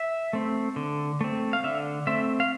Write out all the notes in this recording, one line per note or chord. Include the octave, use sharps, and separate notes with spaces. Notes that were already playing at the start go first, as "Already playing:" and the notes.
Already playing: E5
A3 C4
D3
A3 C4
F5
D3 E5
A3 C4 E5
F5